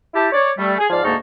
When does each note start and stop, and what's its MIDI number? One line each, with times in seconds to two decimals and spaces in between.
0.14 0.27 64
0.14 0.27 67
0.14 0.27 81
0.33 0.50 73
0.33 0.50 74
0.57 0.74 55
0.57 0.74 57
0.79 0.90 68
0.90 1.02 44
0.90 1.02 53
0.90 1.02 74
0.90 1.02 77
1.04 1.15 38
1.04 1.15 44
1.04 1.15 58
1.04 1.15 63
1.04 1.15 81
1.04 1.15 85